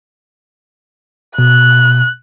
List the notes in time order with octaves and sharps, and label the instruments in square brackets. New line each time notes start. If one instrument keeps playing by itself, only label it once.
[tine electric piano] B2 [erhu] F#6